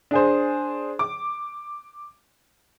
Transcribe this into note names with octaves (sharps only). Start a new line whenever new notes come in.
D4 G#4 C5
D6